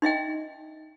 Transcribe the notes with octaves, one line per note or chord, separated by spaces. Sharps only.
D#4 D#5 E5 G5